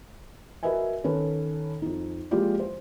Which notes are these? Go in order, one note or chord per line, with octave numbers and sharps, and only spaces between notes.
F#4 A#4 B4 D#5 E5 G#5
D#3 C#4 A4 B4
F2 D#4
F3 G#3 A#3 F4 G4 D5
C5